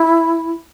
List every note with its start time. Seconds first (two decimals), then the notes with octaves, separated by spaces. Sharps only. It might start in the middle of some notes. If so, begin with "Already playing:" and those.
Already playing: E4